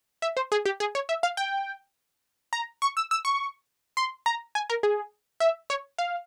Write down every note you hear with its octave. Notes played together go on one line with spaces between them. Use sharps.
E5
C5
G#4
G4
G#4
C#5
E5
F5
G5
A#5
C#6
E6
E6
C#6
C6
A#5
G#5
A#4
G#4
E5
C#5
F5